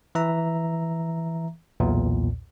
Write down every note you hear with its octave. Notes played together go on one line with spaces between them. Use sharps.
E3 E5 A#5
B1 E2 A#2